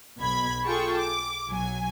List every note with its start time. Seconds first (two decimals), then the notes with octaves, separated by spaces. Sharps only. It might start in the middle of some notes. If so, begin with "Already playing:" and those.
0.20 B1 B2 B5 G#6
0.66 F4 G#4 A4 G5 A5 C#6
0.98 D6
1.49 B1 F#3 G#5